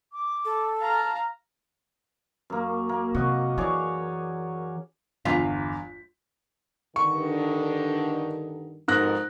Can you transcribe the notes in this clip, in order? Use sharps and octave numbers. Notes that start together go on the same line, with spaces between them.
D6
A4
F5 A5 A#5
F#2 A#3
A#3
C3 F#4 D#5
E3 G#4 C#5 D5
G1 E2 F4 B6
G2 D3 D#3 C#6
F2 G#2 B2 A#4 F#6 A#6